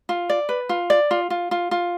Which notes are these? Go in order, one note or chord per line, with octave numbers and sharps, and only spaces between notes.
F4
D5
B4
F4
D5
F4
F4
F4
F4